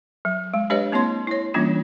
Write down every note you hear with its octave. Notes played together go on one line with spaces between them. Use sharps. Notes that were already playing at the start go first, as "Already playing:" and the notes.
F#3
G#3
G#3 D4 G4 B4 C#5 D#5
A#3 C4 E4 C#5 C6
E4 C#5
E3 G3 A#3 C#4 D4 F4